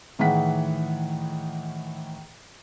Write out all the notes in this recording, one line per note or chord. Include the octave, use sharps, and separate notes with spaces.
A2 D#3 E3 G#4 F#5 B6